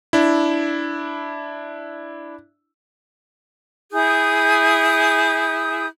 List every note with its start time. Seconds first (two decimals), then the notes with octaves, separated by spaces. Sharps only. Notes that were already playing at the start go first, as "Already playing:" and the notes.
0.13 D4 E4
3.92 E4 G#4 D#6 G6